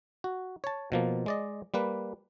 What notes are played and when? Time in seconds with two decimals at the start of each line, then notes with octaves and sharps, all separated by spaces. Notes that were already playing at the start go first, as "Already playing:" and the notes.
0.24 F#4
0.64 C#5 A5
0.92 B2 F3 A#3
1.26 G#3 D5 D#5
1.74 G3 A#3 B4